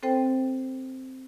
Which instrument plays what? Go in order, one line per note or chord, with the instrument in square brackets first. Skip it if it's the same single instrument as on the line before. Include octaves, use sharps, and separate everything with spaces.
[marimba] C4 A4 C5 G5